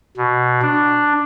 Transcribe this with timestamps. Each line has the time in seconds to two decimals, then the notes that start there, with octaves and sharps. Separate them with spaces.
0.17 B2
0.62 D4